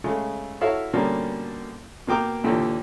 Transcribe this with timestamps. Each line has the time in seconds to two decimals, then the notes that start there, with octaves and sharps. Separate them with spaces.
0.04 C#3 G#3 A3
0.61 E4 F#4 A4 C#5 E5 F5
0.93 B2 D3 G3 A#3 C#4
2.07 B2 A#3 G5 D6 F6
2.44 D#2 A#2 D3 E3 G4